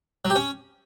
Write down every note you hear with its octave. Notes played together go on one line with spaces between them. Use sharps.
F#3
G4
C#4